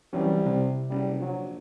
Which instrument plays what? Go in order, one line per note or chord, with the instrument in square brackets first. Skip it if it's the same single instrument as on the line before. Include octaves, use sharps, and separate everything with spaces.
[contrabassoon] C2 [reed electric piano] E3 F#3 C#4 [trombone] G3
[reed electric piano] C3
[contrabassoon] F#1 [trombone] G3
[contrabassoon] A#1 [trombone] F#3